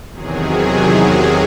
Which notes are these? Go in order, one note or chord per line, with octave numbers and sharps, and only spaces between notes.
E2 C3 D#3 F#3 G#4